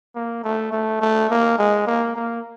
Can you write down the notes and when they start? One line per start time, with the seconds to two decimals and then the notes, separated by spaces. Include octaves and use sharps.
0.15 A#3
0.44 A3
0.73 A3
1.01 A3
1.30 A#3
1.59 G#3
1.87 A#3
2.16 A#3